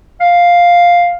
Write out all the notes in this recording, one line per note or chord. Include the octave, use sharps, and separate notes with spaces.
F5